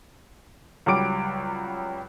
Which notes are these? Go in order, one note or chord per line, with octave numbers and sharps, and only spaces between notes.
C#2 F#3 G3 D6 D7